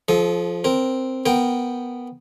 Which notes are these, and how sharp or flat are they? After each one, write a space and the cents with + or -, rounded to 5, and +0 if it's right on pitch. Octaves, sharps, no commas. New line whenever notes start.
F3 +0 A4 -35 D#5 +0
C4 +0 A#4 +0
B3 +0 A#4 +0 G5 +0